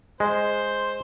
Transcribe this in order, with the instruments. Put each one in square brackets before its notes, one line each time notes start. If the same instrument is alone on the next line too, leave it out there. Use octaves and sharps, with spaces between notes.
[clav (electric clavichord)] G#3 [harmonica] C5